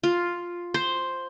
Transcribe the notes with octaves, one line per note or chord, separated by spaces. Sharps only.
F4
C5